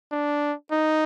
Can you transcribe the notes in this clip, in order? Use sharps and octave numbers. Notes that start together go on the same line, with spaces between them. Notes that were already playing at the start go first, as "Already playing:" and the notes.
D4
D#4